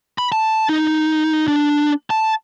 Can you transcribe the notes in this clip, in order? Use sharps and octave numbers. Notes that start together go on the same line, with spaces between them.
B5
A5
D#4
D4
A5